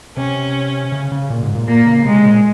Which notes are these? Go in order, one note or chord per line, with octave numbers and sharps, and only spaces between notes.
C3 C#4
C#3
C#3
A#2
G#2
A#2
A#2 A#3
C#3
C3 G#3
A#2